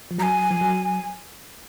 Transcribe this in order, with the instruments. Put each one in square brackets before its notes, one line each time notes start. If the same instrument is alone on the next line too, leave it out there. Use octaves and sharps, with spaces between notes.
[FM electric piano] F3
[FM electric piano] F#3 [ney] A#5
[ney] G#5
[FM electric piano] F3
F#3